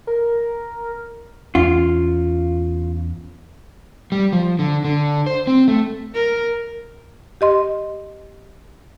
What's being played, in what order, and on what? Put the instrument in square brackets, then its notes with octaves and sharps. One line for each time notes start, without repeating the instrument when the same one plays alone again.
[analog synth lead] A#4
[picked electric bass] E2 C#4 [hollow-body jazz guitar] F4
[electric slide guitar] G3
F3
D3
D3
C5
C4
A3
[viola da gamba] A#4
[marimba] G4 D#5 C6